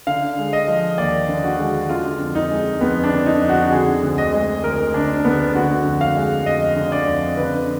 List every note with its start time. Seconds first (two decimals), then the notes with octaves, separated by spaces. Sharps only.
0.07 D3 F5
0.38 G#3
0.53 D#5
0.68 F3
0.98 D#2 D5
1.29 D3
1.44 F#4
1.59 G#3
1.89 D3 F4
2.20 F2
2.35 D#4
2.50 G#3
2.81 F2 B3
3.03 D4
3.11 D3
3.26 D#4
3.42 F2
3.49 F#4
3.72 D3 G#4
4.03 D2
4.18 D#5
4.33 G#3
4.64 D2 A#4
4.94 D3 D4
5.25 D2 B3
5.55 D3 F#4
5.86 F2
6.01 F5
6.16 G#3
6.46 F2 D#5
6.76 D3
6.92 D5
7.07 F2
7.37 D3 B4